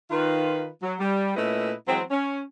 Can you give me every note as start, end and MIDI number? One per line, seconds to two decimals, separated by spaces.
0.11 0.68 51
0.11 0.68 65
0.11 0.68 71
0.83 0.94 54
1.00 1.34 55
1.37 1.73 46
1.37 1.73 57
1.37 1.73 61
1.37 1.73 64
1.37 1.73 71
1.37 1.73 75
1.88 2.03 52
1.88 2.03 54
1.88 2.03 56
1.88 2.03 60
2.11 2.42 61